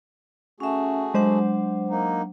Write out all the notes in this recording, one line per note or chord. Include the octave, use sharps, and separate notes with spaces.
A3 C#4 F#4 G#4 E5
F#3 G#3 D4 C5 F#5
A#3 D#4